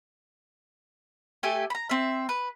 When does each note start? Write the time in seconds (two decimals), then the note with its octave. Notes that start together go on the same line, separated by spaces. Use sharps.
1.43 A3 G4 A4 G#5
1.70 A#5 B5
1.90 C4 E5
2.29 B4